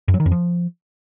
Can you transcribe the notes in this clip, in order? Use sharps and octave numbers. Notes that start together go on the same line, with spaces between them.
F#2
F#3
D#3
F2
F3